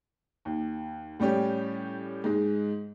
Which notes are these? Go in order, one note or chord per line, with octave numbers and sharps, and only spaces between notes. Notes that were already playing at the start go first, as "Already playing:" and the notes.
D#2
A2 G3 C#4 G4
G#2 G#3